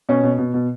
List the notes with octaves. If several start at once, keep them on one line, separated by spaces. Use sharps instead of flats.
B2 C#4
B2
B2
B2